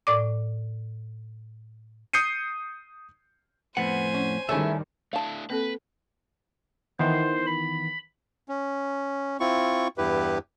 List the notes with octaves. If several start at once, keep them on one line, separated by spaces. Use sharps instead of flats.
A2 D5 D6
D#6 G6 C7 C#7 D#7
F2 A2 B3 C5 F#5 G#5
C#4
D#3 G3 A3 C#4 E4 G#4 C#5 E5
A3 D4 E4 F5 A5
A#3 C4 A4 B4
D#3 E3 B3 C5
B5
C#4
C4 E4 F4 C#6
E2 G2 E4 G4 B4